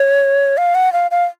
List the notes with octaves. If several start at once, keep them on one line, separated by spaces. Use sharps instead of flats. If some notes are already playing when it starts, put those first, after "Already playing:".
Already playing: C#5
F5
F#5
F5
F5